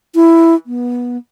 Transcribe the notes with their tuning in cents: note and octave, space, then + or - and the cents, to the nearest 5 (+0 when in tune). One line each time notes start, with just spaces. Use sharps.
E4 +5
B3 -20